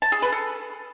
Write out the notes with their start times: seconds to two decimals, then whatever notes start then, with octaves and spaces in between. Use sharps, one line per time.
0.02 A5
0.12 G#4
0.22 B4
0.32 A4